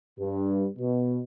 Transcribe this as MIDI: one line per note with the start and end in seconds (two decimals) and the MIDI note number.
0.19 0.67 43
0.78 1.20 47